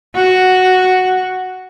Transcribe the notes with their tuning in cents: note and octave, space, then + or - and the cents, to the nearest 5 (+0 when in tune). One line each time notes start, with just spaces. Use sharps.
F#4 +0